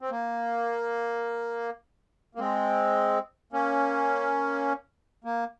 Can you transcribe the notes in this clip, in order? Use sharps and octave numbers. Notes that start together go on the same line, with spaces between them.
C4
A#3
A#3
G#3 C4
A#3 C#4
A#3